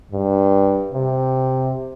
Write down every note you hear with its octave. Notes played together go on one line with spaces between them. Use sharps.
G2
C3